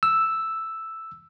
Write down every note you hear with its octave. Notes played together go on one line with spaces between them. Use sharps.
E6